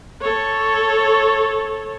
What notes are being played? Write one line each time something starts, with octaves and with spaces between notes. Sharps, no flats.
A4 C#5